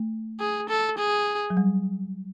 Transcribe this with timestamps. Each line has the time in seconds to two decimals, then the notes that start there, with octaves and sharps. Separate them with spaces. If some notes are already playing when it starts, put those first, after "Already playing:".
Already playing: A3
0.40 G#4
0.69 A4
0.98 G#4
1.50 F#3
1.57 G3